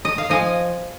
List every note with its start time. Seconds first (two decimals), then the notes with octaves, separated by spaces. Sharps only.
0.05 D#5
0.18 F5
0.30 F3 D#5 G#5